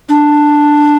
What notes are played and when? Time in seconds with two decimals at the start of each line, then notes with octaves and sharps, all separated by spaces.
0.09 D4